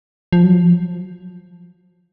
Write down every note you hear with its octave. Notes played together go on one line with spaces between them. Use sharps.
F3
F#3
F3